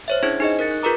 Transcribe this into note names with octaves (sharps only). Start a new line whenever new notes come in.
C5 C#5 E5
C#4 D4 E4 G#4 C5 G#6
D#4 G#4 D#5
A#4 F#6 A6 C#7
F#6
F4 G#4 A#4 B4 A#5 D6